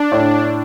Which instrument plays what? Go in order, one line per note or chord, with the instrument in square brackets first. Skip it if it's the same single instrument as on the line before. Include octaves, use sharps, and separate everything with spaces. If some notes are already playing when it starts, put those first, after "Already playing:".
Already playing: [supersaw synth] D4
[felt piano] A2